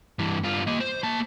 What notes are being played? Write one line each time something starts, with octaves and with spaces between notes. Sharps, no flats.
G2 E3
G2 F4
A#3 D#5
C5
A#3 A5